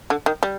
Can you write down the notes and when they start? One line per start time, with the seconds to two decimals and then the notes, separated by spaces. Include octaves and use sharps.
0.10 D3
0.26 D#3
0.43 G3